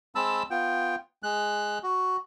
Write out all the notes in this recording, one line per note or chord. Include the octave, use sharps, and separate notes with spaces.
G#3 C4 A5 B5 E6
B3 F4 G5
G#3 F#6
F#4